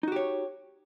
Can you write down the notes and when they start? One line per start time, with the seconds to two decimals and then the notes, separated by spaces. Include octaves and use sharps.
0.03 D#4
0.08 F#4
0.12 G4
0.16 C#5